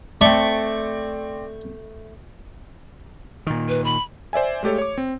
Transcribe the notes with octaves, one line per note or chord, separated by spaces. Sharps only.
A3 C4 D5 C#6
A#2 D#3
B4
B5
C5 D5 E5 G#5
G#3 A3 G4 A4 C#5
C#5 D6
C4